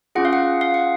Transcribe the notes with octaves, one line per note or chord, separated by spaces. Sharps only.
C#4 F4 G#4 F#5
F5
F#5
F5
F#5